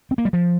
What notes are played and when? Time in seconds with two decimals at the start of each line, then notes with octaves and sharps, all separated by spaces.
0.11 C4
0.18 A#3
0.25 G3
0.33 F3